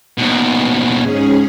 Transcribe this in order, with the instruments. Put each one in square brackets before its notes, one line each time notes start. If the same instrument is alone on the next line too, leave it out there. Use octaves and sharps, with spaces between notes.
[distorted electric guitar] D#2 B2
[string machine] G#2 C#4 G#4